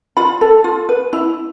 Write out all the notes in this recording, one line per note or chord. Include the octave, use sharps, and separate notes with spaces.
F4 B5
A4
F4
B4
E4